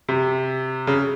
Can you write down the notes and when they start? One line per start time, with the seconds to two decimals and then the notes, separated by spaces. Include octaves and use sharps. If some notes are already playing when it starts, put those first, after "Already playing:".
0.09 C3
0.87 C#3